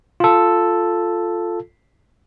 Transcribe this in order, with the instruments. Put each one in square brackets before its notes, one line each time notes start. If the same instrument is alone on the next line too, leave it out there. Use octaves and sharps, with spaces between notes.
[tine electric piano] F4 A4